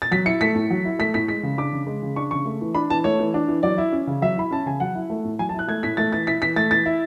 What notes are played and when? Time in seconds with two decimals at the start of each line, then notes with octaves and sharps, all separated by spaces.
0.02 A6
0.11 F#3 B6
0.26 E4 C#7
0.41 A3 B6
0.55 A2
0.70 F#3
0.85 E4
0.99 A3 B6
1.14 A2 B6
1.28 G#3 B6
1.43 C#3
1.58 D4 D6
1.73 C#3
1.87 G#3
2.02 C#3
2.16 D4 C#6
2.31 C#3 C#6
2.45 A3
2.61 E3
2.75 D4 B5
2.90 E3 A5
3.04 A3 C#5
3.19 E3
3.34 D4
3.48 E3
3.63 F#3 D5
3.78 E4
3.92 C#4
4.07 C#3
4.22 F#3 E5
4.36 E4 B5
4.51 C#4 A5
4.66 C#3 G#5
4.80 F#3 F#5
4.95 E4
5.10 A3
5.24 A2
5.39 F#3 G#5
5.49 A5
5.54 E4 F#6
5.68 A3 G#6
5.83 A2 B6
5.97 A3 A6
6.12 E3 A6
6.27 E4 B6
6.42 E3 B6
6.56 A3 A6
6.71 E3 A6
6.86 E4